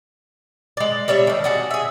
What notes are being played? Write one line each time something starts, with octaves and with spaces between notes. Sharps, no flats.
G#3 D5
G3 D4 C#5 E5
D#3 A3
D4 F#4 G#4
G#4 E5